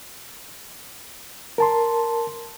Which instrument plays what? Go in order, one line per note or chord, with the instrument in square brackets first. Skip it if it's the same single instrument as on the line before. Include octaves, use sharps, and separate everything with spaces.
[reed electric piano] A#4 A5 C6